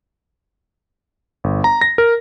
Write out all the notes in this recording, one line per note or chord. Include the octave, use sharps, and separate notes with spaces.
G1
A#5
A#6
A#4